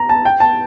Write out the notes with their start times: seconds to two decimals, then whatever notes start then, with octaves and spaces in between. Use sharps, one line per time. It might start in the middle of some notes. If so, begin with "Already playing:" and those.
Already playing: A#5
0.09 A5
0.25 G5
0.40 A5